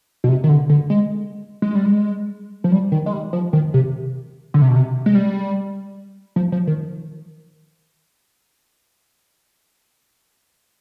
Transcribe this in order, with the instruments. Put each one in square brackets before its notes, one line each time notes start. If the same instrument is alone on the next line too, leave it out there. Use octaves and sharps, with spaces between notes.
[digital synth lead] B2
C3
D#3
D3
D3
G#3
G#3
G3
G#3
F3
G3
D#3
G#3
G3
F3
D#3
C3
D3
C3
B2
C3
G#3
G3
F3
F3
D#3